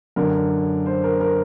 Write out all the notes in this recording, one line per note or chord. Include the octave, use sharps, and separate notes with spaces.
F#2 D3 A#4
C5
A#4
A#4